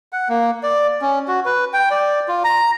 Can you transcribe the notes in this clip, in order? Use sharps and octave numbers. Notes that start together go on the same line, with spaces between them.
F#5
A#3
D5
C#4
F#4
B4
G5
D5
F4
A#5